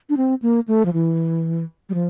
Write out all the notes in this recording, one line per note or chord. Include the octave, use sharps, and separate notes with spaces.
D4
C4
A#3
A3
F3
E3
G3
F3